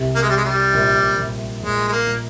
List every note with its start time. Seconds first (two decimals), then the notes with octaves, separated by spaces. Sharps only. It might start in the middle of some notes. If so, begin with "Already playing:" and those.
Already playing: C2 C3
0.16 A#3
0.22 G#3
0.30 G3
0.37 G#3
0.45 G3
0.74 A#1 A#2
1.19 A#1 A#2
1.62 A#1 A#2 G#3
1.88 G#3
1.92 A#3
2.07 A#2